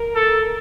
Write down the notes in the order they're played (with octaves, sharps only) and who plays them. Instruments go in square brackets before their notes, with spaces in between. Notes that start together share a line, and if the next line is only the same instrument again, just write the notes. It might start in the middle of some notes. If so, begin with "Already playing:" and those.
Already playing: [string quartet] A#4
[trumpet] A4